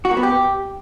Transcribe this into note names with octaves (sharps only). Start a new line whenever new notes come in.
F#4
A#3
B3
G4